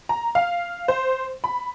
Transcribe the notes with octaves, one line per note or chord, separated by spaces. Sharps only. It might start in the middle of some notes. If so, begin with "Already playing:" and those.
A#5
F5
C5
B5